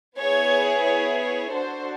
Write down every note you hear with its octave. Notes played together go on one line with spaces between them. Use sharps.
B3 E4 G#4 C#5
C#5
C#5
D4 F#4 A4 C5